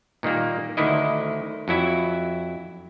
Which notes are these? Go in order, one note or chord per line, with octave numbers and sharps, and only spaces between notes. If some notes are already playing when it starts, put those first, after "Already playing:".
A#2 D#3 G3 A#3
D2 D3 D#3 E4 D#5
F2 F#3 E4 E5